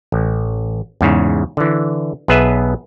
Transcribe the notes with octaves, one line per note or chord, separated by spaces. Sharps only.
A1
E2 G#2 C#3
D3 E3
B1 B3 G#4 B4 E5